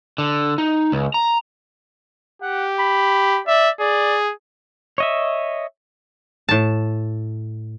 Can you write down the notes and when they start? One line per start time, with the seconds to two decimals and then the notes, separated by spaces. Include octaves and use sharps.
0.18 D3
0.58 D#4
0.92 C#2
1.14 A#5
2.42 G4 F#5
2.79 B5
3.47 D5 E5
3.80 G#4 D5
4.98 C#5 D#5 E5
6.49 A2 A5